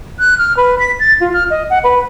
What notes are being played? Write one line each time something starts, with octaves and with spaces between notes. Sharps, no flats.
F#6
F6
B4
B6
A6
F4
F6
D#5
F#5
B4